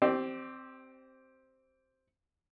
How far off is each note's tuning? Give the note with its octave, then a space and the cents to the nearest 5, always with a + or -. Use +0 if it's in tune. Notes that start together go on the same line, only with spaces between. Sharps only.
C4 +0 G4 -25 D5 +30